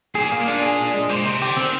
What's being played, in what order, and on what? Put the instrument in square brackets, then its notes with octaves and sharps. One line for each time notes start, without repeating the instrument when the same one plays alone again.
[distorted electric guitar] A#2 [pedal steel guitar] G#4
[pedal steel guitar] A#3
[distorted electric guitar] A#2
[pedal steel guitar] D4
G#4
D4
G#3
[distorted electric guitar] A#2 [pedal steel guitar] C5
[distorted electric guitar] C3 [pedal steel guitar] C5
[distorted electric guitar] D3 [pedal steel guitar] G4
[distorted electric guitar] D#3 [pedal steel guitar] C4